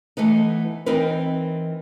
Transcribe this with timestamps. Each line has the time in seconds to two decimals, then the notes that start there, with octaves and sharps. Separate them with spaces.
0.17 E3 A3 B3 D#4
0.86 E3 C4 D#4 A#4 B4